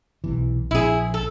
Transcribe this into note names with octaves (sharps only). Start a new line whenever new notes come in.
B1 C3 E3
A#1 C4 E4 G#4
A4